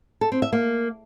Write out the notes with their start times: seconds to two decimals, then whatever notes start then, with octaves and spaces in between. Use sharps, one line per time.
0.21 A4
0.32 C4
0.42 E5
0.53 A#3